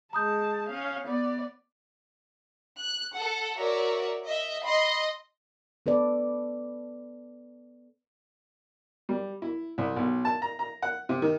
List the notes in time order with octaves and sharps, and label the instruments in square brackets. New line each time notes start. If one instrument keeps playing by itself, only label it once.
[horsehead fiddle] G#3 A5 [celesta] A#5 D#6 G6
[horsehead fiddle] C#4 F5
B3 D5
[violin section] F#6
A4 F#5
F#4 A#4 C#5 D5 E5
D#5 E5
D#5 B5 C6
[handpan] B3 A4 B4 D5
[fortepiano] G3
E4
C2
B1
A5
A#5
A#5
F#5
C3
D#3